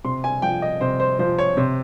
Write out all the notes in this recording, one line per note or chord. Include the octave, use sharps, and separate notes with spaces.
C3 C6
G#5
F3 G5
D#5
C3 C5
C5
F3 C5
C#5
C3 C5